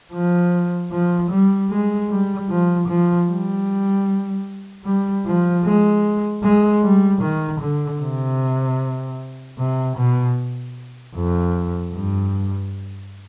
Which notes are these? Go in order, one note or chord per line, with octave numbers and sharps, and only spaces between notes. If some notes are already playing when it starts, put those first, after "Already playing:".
F3
F3
G3
G#3
G3
F3
F3
G3
G3
F3
G#3
G#3
G3
D#3
D3
C3
C3
B2
F2
G2